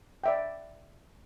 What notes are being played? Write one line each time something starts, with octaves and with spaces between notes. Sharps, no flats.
D5 E5 G5